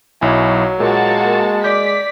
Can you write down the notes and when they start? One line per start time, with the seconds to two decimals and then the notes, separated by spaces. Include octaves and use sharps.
0.21 B1 F#3 E4 G#5
0.80 A#2 G#3 A#3 F#4 A5
1.64 D5 D6 G6 B6